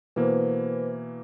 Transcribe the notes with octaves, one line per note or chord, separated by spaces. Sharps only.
B2 E3 A#3 B4 C5